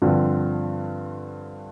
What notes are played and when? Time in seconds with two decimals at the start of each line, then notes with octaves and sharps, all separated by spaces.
0.02 G2 D3 F3 C4 F4